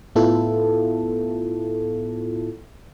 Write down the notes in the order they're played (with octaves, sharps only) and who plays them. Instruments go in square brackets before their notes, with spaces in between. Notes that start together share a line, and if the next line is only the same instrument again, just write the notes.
[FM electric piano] A2 B3 E4 F4 A4